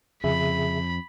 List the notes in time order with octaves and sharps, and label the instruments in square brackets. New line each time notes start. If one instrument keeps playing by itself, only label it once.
[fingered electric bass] F2 [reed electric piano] C#3 G#4 E5 [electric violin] B5